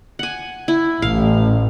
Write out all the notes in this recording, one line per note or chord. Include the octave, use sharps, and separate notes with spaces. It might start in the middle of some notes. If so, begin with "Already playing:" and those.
F#5 G#5
E4
A1 F5